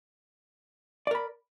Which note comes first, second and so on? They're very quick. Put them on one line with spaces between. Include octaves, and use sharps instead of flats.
D5 A#4 B5